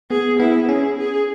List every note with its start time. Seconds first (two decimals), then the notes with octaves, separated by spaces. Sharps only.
0.10 B3 G#4
0.39 B3 E4
0.69 C#4 G#4
0.98 G#4